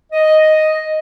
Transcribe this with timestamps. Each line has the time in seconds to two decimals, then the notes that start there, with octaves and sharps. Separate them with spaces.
0.13 D#5